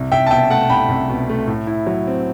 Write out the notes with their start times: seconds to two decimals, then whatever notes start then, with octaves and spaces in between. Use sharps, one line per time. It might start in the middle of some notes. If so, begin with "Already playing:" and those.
Already playing: C2
0.12 C2 E5 G5
0.27 A5
0.31 B2 E5 G5
0.50 A3 F#5 A5
0.70 C2 G5 B5
0.89 C2
1.10 B2
1.29 A3
1.48 A2
1.67 E4
1.87 F#3
2.07 C4